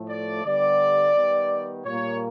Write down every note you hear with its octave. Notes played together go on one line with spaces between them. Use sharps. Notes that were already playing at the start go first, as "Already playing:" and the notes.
Already playing: A2 F3 A3
D5
D3 G3 B3 D5
D#3 G3 B3
A#2 G3 A#3 C#5